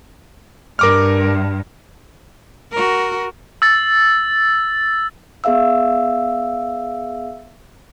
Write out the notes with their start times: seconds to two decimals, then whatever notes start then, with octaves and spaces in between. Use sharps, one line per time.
0.79 G2 A#4 D6 F6
2.71 F#4 A#4
3.62 E6 A6
5.44 B3 G#4 E5 F5 E6